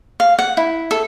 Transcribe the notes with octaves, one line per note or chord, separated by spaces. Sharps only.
F5
F#5
E4
A4